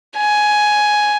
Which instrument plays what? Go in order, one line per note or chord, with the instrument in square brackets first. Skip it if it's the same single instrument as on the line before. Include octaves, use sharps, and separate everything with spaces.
[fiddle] G#5